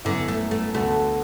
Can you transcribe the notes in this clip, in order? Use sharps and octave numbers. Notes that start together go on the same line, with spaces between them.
F#2 D3 F#3 B3 E4
A3
A3
D2 D3 A3 B3 F#4